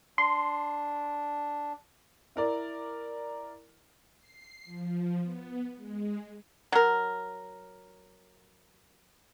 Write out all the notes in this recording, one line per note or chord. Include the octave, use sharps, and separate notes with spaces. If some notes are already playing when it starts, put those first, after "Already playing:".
D4 C6
E4 A#4 D5
C7
F3
B3
G#3
F#3 A#4